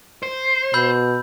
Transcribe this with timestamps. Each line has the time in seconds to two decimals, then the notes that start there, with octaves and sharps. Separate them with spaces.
0.23 C5
0.74 B2 B5 E6 G6